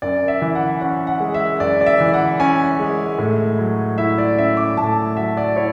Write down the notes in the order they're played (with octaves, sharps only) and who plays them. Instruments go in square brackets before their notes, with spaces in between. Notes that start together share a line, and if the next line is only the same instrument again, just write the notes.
[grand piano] F#2 D5
E5
E3
F#5
C#4 F#5
F#5
G#3
E5
F#2 D5
D5
E5
E3
F#5
C#4 G#5
G#3
A2
F#3
E4 E5
D5
C#4 E5
D6
A2 A5
F#3 E5
D5
E4 C#5